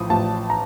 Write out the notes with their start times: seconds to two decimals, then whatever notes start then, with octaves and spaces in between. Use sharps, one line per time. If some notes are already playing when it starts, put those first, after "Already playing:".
Already playing: A1 A2 F3 D#6
0.10 A1 A2 F3 A5
0.50 A#5